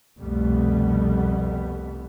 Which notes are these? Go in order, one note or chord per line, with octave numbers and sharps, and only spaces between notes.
C2 F2 B2 G3 A3 B3